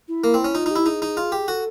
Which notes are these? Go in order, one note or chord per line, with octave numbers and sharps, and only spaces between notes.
E4
A#3
C4
C#4
D#4 F4
D#4
E4 G4
D#4 G#4
D#4
F4
G4
F#4 A4